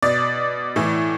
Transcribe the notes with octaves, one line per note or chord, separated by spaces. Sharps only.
B2 D5
A2 E3